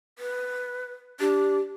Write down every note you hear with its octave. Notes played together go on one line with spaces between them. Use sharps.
B4
D4 G4